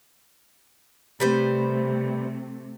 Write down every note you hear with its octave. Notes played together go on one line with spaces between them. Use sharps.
C3 G3 A3 B4 C5